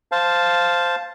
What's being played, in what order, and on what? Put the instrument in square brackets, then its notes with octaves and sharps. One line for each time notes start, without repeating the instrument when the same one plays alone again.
[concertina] C5 F5 A5